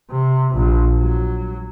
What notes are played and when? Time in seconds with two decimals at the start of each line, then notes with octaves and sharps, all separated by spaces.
0.11 C3
0.54 A#1
1.00 F#3